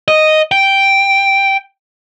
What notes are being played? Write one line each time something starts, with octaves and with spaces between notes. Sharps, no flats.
D#5
G5